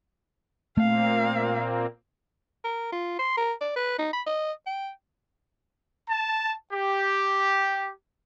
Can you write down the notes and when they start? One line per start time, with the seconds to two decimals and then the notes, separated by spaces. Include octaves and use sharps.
0.77 A#2 A3 A#3 C4 F5
2.64 A#4
2.92 F4
3.19 C6
3.37 A#4
3.61 D5
3.76 B4
3.98 D#4
4.13 B5
4.26 D#5
4.66 G5
6.09 A5
6.71 G4